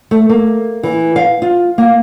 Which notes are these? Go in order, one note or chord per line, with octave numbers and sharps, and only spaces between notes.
A3
A#3
E3
F5
F4
A#3